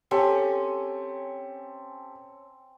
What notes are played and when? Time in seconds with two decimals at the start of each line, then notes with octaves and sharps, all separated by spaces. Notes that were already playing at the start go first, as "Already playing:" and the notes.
0.11 C4 C#4 G4 A4 G#5